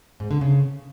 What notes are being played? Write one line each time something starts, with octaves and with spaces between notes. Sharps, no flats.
G#2
D3
C#3